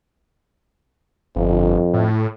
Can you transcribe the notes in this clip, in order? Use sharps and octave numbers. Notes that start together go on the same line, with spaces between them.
G1 F2
A2